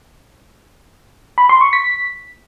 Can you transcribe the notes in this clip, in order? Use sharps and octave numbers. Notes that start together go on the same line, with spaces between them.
B5
C6
C#6
B6